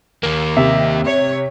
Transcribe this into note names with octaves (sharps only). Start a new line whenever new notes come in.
D#2 A#3
C3 E5
C#5